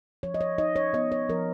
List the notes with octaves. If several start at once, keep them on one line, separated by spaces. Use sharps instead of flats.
F3 C#5
D#5
C#5
D#4 D#5
C#5
B3 D#5
C#5
F3 A#4